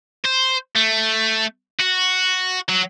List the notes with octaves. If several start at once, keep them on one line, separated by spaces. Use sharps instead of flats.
C5
A3
F#4
F#3